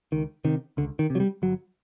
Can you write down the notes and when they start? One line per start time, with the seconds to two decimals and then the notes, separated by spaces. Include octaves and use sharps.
0.12 C#2 D#3
0.44 C3 D#3
0.77 C#2 D3
0.99 D#3
1.10 C3
1.15 F#3
1.20 G3
1.42 G1 F#3